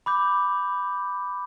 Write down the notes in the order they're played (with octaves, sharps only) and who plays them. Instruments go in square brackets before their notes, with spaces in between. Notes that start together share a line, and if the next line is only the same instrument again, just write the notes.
[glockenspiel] B5 D6 G6